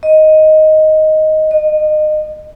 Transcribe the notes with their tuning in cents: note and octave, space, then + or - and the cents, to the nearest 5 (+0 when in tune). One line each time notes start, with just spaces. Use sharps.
D#5 +5
D#5 -25